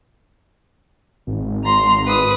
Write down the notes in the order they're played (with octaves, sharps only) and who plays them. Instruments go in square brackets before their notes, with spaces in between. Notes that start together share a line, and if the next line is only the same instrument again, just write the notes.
[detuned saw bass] G#1
[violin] A#5 C6
B4 D#6